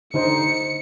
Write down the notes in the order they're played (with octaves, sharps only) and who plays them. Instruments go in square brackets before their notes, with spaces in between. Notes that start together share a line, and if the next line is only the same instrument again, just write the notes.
[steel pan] D3 D#4 C5 [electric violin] C#7